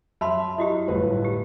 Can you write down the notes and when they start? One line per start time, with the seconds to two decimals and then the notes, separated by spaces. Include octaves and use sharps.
0.21 F#2 E5 A5 B5 C6
0.58 E4 F#4 G4 D#5
0.88 G1 A2 B4
1.24 G4